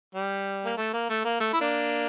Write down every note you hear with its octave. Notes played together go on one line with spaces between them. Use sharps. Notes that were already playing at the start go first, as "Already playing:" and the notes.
G3
A#3
A3
A#3
A3
A#3
A3
E4
A#3 D4